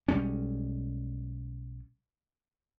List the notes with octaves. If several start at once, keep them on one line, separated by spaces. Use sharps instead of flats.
B1 G3 G#3 C#4